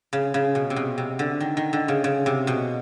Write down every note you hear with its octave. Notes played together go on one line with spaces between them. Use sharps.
C#3
C#3
B2
C3
B2
C3
D3
D#3
D#3
D3
C#3
C#3
C3
B2